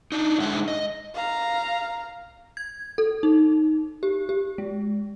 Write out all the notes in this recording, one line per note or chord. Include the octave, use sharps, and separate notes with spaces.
D4 D#4
G#3 D4 D#4 C5 E5 F#5
D#5
F5 A#5
G#6
A4
D#4
G4
G4
G#3